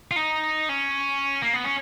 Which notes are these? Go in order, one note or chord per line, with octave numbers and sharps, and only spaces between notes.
F4
D#4
C#4
A#3
B3
C#4